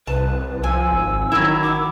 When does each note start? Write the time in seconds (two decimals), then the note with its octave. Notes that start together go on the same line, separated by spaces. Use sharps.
0.07 C2 B4 A5
0.64 F3 G#5 E6
0.92 G#1
1.32 D#3 F#3 E4
1.62 D6